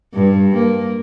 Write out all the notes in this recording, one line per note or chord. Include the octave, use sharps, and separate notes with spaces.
G2
A#3